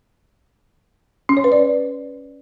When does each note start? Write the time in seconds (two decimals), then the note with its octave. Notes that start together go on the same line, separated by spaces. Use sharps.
1.29 C#4
1.37 C#5
1.44 B4
1.52 D5